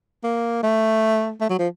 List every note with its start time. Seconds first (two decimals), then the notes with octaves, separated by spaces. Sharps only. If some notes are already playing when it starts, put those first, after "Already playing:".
0.24 A#3
0.63 A3
1.41 A3
1.49 F#3
1.59 F3